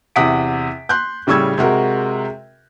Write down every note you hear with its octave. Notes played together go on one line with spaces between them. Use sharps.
E2 C3 F#5 D#6 B6 D7
C6 F#6 G6
A2 C#3 G3 C#6 E6 G#6
C3 G#3 F#4 A#4